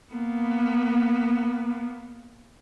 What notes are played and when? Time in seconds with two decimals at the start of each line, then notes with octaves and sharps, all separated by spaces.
0.13 A#3 B3